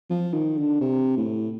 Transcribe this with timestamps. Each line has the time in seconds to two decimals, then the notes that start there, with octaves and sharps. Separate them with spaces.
0.10 F3
0.33 D#3
0.57 D3
0.81 C3
1.17 A2